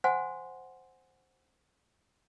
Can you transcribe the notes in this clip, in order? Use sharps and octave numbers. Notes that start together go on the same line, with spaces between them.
C5 F#5 G#5 C6